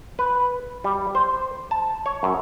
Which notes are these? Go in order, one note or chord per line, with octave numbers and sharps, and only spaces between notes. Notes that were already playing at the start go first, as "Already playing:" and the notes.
B4
G3
C5
A5
C#5
F#2